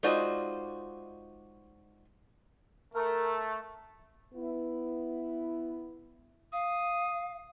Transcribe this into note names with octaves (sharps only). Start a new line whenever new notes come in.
G#3 D#4 F4 F#4 C5 D5
A3 A#4
B3 E4
F5 D#6